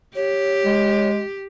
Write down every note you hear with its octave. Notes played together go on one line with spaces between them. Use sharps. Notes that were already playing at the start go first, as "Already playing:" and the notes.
G4 C#5
G#3